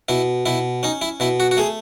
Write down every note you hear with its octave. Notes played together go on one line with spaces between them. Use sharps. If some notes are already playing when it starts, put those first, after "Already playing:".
B2 E4
B2 E4
C#4 D#4
E4
B2 E4
F#4
F#4
A3 G#4